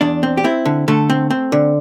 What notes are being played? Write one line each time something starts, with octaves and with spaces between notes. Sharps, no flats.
E2 D4
C4
G4
C4 E4
D3
D3 A3 A4
C4
C4
D3